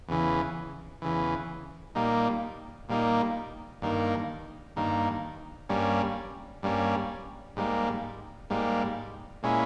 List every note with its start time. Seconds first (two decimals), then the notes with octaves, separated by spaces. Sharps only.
0.08 E2 C#3 E3
1.02 E2 C#3 E3
1.95 A#2 G3 A#3 D#4
2.89 A#2 G3 A#3 D#4
3.82 G2 D#3 A#3
4.76 G2 D#3 A#3
5.69 G2 G3 A#3 C#4
6.63 G2 G3 A#3 C#4
7.57 G#2 G3 A#3
8.50 G#2 G3 A#3
9.43 A#2 G#3 C#4 E4